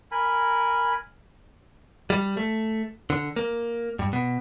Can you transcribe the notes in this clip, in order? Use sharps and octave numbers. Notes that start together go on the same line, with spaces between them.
A#4 G#5 B5
G3
A3
D3
A#3
G2
B2